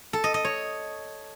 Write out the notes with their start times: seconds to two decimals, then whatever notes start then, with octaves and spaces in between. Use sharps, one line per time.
0.13 A4
0.24 D#5
0.34 D#5
0.45 C#5